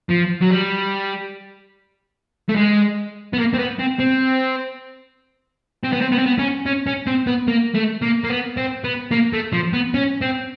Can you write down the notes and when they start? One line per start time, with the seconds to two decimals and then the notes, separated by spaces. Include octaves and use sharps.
0.10 F3
0.42 F#3
0.51 G3
2.49 A3
2.56 G#3
3.33 B3
3.38 A#3
3.54 C4
3.59 B3
3.79 C4
3.99 C4
5.84 C4
5.92 B3
6.01 C4
6.12 B3
6.18 C4
6.26 B3
6.38 C#4
6.66 C#4
6.86 C#4
7.07 C4
7.27 B3
7.48 A#3
7.75 A3
8.02 A#3
8.24 A#3
8.30 B3
8.57 C4
8.84 B3
9.11 A#3
9.33 A3
9.53 F3
9.73 B3
9.94 C#4
10.21 C4